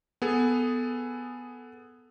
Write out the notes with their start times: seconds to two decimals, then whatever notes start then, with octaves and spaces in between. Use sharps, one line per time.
0.22 B3 G#4 A4